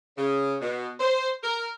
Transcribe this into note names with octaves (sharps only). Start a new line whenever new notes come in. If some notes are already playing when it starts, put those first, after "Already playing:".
C#3
B2
C5
A#4